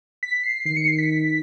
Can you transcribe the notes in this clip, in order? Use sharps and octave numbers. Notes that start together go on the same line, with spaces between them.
B6
C7
D#3 C7
C#7
C7
B6